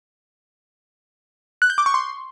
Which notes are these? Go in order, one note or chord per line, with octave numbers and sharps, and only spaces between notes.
F#6
G6
D6
C#6
C6